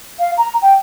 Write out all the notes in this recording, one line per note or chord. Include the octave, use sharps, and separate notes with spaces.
F5
A#5
G5